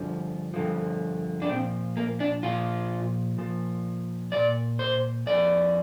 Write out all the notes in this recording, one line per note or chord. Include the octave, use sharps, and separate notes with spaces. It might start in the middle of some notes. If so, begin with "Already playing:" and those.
Already playing: G2 D3 F3
G2 D3 F3
D4
A#2 F3 C4
A#3
D4
A#2 F3 F4
A#2 F3
A#2 F3 D5
C5
F2 F3 D5